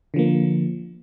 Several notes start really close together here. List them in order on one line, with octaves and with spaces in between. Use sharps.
D3 F3 A#3